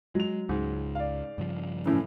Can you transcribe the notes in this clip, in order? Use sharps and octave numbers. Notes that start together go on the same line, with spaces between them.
F#3 G#3 F7
C#2 G#2
D5 F5
G2 C#3 F3
A2 E3 C#4